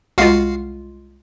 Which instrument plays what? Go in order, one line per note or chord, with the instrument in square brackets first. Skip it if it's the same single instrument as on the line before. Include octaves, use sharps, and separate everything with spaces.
[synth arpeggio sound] C2 G#3 F4 [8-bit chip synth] F#4 F5 C7